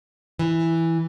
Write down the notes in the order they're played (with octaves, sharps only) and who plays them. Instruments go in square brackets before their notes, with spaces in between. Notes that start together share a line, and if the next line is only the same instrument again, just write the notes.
[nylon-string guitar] E3